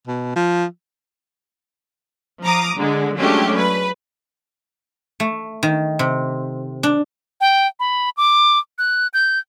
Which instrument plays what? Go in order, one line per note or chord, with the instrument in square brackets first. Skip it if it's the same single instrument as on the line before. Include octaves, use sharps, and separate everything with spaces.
[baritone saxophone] B2
F3
[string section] F3 A#5 D6 D#6
D3 G#3
F#3 G#3 A3 C#4 D4 G4
B4
[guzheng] A3
D#3
C3
D4
[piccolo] G5
B5
D6
F#6
G6